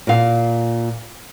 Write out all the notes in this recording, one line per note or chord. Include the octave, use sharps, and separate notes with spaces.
A#2 F5